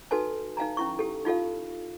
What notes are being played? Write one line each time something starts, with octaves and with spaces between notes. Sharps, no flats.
D#4 F#4 A4 B4 G#5 A5
D#4 F5 G#5 A#5
C#4 E4 C#6
G4 A4
D#4 F4 A4 F5